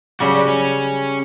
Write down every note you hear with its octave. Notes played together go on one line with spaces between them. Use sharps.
C#3 F#3 G3 F#4
C#4